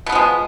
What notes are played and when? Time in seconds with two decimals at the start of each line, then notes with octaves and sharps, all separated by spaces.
0.06 B2
0.09 B3
0.12 F3
0.15 G#3